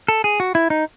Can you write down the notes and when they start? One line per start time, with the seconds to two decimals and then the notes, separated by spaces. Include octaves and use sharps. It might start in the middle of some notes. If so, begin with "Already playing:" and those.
0.08 A4
0.24 G#4
0.40 F#4
0.55 E4
0.70 D#4